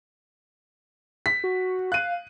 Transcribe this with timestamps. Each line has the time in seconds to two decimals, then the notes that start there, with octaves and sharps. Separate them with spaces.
1.26 B6
1.44 F#4
1.92 F5 F#6 D#7